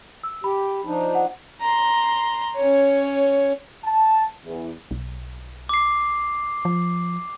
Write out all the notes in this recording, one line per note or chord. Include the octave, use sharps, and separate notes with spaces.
E6
G4 B5
F3 D4 D#4
F#5
A#5 C6
C#4 C#5
A5
E2
B1
D6 C7
F3